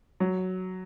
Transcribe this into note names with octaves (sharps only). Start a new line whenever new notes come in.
F#3